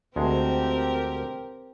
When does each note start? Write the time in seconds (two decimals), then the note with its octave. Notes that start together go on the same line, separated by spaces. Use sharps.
0.16 D2 G#3 C4 G4 A#4